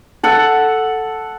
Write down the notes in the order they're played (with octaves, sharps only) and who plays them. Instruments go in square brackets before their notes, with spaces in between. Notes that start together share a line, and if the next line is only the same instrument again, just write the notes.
[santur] A4 F#5